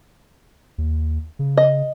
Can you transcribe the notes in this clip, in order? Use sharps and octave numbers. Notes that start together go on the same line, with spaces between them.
D#2
C#3
D#5